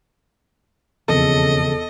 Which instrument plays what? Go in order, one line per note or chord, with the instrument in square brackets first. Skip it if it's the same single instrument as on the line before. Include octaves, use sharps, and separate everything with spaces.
[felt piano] E1 F2 [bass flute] C#3 [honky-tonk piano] A4 [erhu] D#5